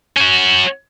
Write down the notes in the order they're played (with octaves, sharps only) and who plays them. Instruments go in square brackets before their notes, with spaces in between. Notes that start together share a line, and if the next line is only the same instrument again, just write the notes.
[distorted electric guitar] C#4 F#4